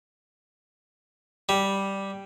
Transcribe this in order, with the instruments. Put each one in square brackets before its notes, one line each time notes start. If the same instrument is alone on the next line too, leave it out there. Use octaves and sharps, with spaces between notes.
[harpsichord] G3